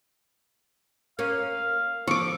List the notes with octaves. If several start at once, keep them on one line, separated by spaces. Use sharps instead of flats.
A#3 C#4 F5
F3 A4 C#6 D6